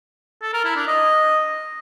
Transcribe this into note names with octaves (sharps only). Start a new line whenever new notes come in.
A4
A#4
E4
D4
D#5